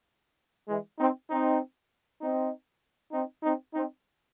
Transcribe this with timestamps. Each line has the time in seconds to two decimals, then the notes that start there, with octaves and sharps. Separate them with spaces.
0.68 E3 G#3
0.98 C4 D#4
1.30 C4 D#4
2.22 C4 D#4
3.12 C4 D#4
3.43 C4 D#4
3.74 C4 D#4